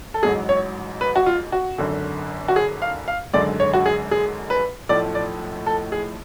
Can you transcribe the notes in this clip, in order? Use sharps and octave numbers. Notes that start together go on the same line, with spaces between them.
A4
A1 G#2 F#3 G#4
C#5
B4
F#4
F4
F#4
G#1 F#2 D3
F#4
G#4
F5
F5
G#1 F#2 D3 G#3 D5
C#5
F#4
G#4
G#4
B4
B1 A2 F3 A3 D5
D5
A4
G#4